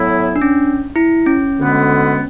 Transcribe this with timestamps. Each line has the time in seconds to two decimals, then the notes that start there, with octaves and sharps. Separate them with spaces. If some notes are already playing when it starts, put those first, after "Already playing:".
Already playing: A2 F#3 B3 E4
0.36 D4
0.42 C#4
0.96 E4
1.26 C#4
1.58 D2 D3 G#3 B3